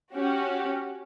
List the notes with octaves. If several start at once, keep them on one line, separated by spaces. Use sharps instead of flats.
C#4 F#4 G4